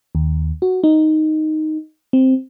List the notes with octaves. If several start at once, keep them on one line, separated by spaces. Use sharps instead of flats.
D#2
F#4
D#4
C4